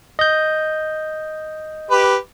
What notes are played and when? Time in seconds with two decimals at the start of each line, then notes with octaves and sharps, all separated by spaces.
0.19 D#5 G6
1.91 G4 B4